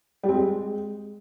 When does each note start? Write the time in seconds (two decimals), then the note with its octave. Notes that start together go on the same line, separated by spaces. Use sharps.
0.23 G3
0.29 C4
0.34 G#3